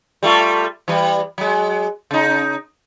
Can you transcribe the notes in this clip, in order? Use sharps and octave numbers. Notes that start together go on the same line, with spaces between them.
G3 A3 F4
E3 G3
F#3 G#3
C#3 D#4